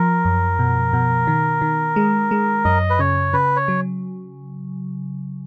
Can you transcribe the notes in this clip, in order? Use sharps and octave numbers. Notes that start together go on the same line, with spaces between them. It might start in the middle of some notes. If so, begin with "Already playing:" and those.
Already playing: F3 A#4
F#2
B2
B2
D#3
D#3
G#3
G#3
F#2 D#5
B4
C#3 C#5
C#3 B4
C#5
F#3